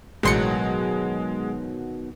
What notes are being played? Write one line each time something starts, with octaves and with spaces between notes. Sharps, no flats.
A1 B2 D#3 F#3 G#3 C6 C#7